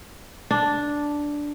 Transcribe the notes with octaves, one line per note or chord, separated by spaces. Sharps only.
D4